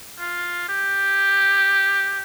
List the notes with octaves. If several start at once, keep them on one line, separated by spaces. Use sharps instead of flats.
F4
G4